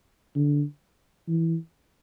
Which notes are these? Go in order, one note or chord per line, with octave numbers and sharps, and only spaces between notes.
D3
E3